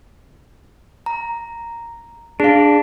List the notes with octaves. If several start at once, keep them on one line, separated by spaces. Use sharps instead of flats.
A#5
D4 G#4 F5